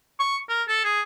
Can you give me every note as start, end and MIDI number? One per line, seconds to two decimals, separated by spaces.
0.20 0.37 85
0.49 0.63 70
0.68 0.82 69
0.84 1.02 68